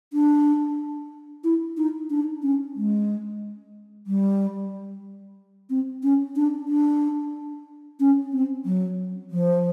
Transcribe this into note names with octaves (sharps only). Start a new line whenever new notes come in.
D4
E4
D#4
D4
C#4
G#3
G3
C4
C#4
D4
D4
C#4
C4
F#3
F3